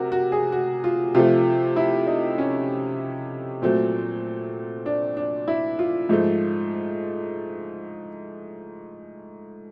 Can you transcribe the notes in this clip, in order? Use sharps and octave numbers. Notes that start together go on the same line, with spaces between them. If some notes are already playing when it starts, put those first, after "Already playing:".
Already playing: C3 F#4 A#4
F#4
G#4
F#4
F4
C3 F3 A3 F4
E4
D#4
C#4
A#2 F#3 A3 C4
D4
D4
E4
F4
G#2 F3 A3